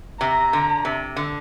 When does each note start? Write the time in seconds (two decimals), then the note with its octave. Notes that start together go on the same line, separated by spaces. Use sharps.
0.21 C3 A#5
0.53 D3
0.85 C3
1.16 D3